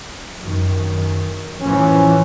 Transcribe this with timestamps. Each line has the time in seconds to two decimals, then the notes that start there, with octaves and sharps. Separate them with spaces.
0.43 F#2 D#3
1.62 A2 E3 F3 C#4